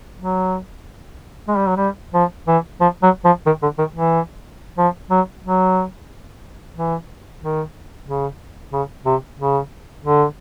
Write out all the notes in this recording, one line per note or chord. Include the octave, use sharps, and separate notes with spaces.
F#3
G#3
G3
F#3
G3
F3
E3
F3
F#3
F3
D#3
D3
D#3
E3
F3
F#3
F#3
E3
D#3
C#3
C#3
C3
C#3
D3